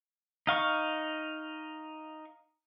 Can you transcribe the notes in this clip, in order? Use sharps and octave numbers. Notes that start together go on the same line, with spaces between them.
D#4 F5 C#6